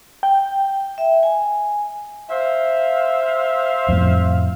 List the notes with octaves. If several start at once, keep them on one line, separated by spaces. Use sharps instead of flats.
G5
E5
G#5
C5 E5 F5
F2 A2